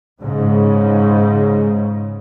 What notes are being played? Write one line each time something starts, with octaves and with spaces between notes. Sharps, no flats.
G#2 C#3